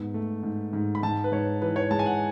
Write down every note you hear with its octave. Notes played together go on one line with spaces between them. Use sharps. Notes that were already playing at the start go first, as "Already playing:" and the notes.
Already playing: G#2 B3
A3
G#2
G#2
B5
G#2 A5
B4
G#2 C#5
E3 B4
C#5
G#3 A5
G#5
F#5